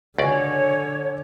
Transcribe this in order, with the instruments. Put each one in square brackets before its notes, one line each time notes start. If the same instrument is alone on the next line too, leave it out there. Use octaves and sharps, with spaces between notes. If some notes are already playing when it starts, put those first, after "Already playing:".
[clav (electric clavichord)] C#2 D5 [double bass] D3 [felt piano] F#4 G#5 [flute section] C#5